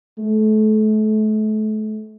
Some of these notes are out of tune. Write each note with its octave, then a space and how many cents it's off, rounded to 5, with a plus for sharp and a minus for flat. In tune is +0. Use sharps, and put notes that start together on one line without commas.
A3 -35